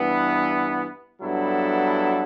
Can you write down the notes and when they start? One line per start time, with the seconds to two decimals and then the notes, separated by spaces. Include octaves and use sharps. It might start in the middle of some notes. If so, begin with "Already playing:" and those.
Already playing: G2 E3 B3
1.20 G2 F#3 B3 E4 A4